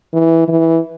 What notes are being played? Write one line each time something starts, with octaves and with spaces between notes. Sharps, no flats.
E3
E3